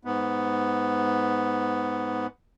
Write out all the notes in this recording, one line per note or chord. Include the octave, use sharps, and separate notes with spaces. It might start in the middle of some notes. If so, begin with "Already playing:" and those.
G#2 B3